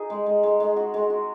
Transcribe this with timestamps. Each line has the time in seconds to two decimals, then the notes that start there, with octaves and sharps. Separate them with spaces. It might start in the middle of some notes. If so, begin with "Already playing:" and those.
Already playing: D#4 G#4
0.10 G#3
0.26 G#3
0.43 G#3
0.60 G#3
0.77 F#4
0.94 G#3
1.10 F#4